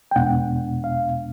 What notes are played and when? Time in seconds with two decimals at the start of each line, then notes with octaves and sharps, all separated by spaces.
0.11 G5
0.16 E2 B2 G#3 B3 D4 F#5
0.84 F5